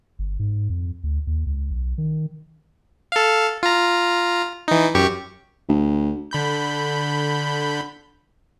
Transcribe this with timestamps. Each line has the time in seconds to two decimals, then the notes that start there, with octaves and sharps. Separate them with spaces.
0.19 G1
0.39 G#2
0.70 F2
1.03 D2
1.27 D#2
1.46 C#2
1.71 B1
1.98 D#3
3.12 A4 F5
3.63 F4 A#5
4.68 E3 D#4
4.95 F#2 G4 C#6
5.69 D2
6.31 D3 B5 G6